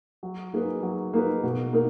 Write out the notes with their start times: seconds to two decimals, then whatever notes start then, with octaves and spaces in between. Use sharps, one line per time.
0.23 F#3
0.54 A#3 D#4 G#4 B4
0.83 F#3
1.13 A#3 D#4 G#4 B4
1.43 B2
1.73 A#3 D#4 A#4